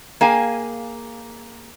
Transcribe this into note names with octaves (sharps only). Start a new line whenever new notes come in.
A#3 G#4 F5 G5 G#5